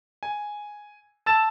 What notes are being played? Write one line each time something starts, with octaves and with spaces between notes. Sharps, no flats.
G#5
A5 E6 A6 E7